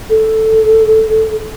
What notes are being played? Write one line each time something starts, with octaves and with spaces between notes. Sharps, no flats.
A4